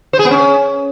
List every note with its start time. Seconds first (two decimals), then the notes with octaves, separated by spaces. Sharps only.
0.13 C5
0.19 G#4
0.25 B3
0.31 C#4